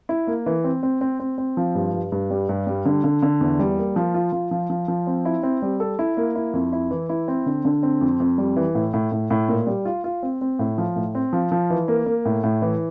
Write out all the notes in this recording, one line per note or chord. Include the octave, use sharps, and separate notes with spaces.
E4
A#3
E3
C4
C4
C4
C4
C4
F3
G2
G2
G2
G3
G2
G3
D3
D3
D3
E2
G3
A#3
F3
F4
F3
F3
F3
F3
C4
E4
C4
G3
A4
E4
A#3
E4
F2
E4
E3
E4
C4
D3
D3
C4
F2
F2
G3
E3
A2
A2
A2
A2
A#2
G3
F4
F4
C4
C4
A2
F3
A2
C4
F3
F3
E3
A#3
A#3
A2
A2
E3